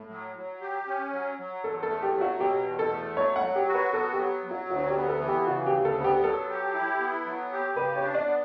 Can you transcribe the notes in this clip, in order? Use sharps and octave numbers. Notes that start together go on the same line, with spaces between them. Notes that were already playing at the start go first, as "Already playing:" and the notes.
Already playing: A2
F#3
F#3
G4
C#4
F#3
F#3
E2 A4
A4
A3
G4
F#3
F#4
B2 G4
E2
A4
A3
F#3 C#5
F#5
F#3
G4
F#4
B4
B3 A4
G4
F#3
F#3
F#4
D2 F#4
G4
B3
A4
E3
G4
C#3 F#4
G4
D2
A4
B3
G4
F#3 A4
G4
E4
B3
F#3
G4
C#3 B4
C#5
D4
D5
B3